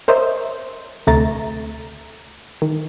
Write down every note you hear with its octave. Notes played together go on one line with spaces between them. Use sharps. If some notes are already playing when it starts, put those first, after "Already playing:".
A#4 C5 C#5 D#5 E5
D2 C3 A3 A#5 A6
D#3